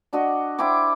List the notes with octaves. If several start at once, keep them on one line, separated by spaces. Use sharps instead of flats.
D4 F#4 D#5
E4 C5 G5 D6